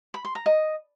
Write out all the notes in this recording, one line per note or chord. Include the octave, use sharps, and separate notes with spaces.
B5
C6
A#5
D#5